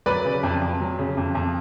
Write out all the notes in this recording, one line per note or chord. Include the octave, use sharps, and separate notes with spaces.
F#3 B4 D5
C#3
F2
F2
F#3
C#3
F2
F2